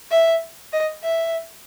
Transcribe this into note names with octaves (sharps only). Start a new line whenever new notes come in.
E5
D#5
E5